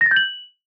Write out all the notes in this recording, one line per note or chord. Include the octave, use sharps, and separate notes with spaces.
A#6
A6
G6
F#7